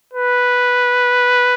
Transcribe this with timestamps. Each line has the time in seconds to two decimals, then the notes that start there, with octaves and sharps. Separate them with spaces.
0.13 B4